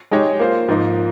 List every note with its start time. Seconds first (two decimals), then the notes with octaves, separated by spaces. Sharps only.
0.11 G#3 D#4 G4 C#5
0.39 A#3 F4 C5
0.68 G#2 F3 A#3 D#4